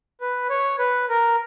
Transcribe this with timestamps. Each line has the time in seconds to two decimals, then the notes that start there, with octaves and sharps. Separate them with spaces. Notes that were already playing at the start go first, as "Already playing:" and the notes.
0.21 B4
0.50 C#5
0.79 B4
1.09 A#4